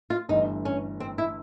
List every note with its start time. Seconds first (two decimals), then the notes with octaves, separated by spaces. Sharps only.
0.10 F4
0.29 G1 G2 E3 A3 D#4
0.65 C#4
1.00 C4
1.18 E4